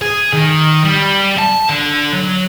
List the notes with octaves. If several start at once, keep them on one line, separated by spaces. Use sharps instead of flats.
G#4
D#3
G3
A5
D3
F#3